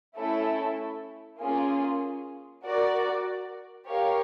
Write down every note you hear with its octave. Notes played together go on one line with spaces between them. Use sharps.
A3 C#4 E4 A4
A#3 C#4 F4 G#4
F#4 A#4 D5
G4 A#4 C#5 F5